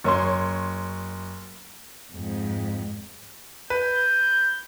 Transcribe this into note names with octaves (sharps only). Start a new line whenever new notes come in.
F#1 C#5 C6
F2 G#2
B4 G6